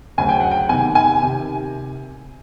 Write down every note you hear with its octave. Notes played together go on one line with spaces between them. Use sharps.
D2 C#3 F#3 G#5
G5
F#5
G5
E2 C3 D#3 G#5
G#5
C3 D#3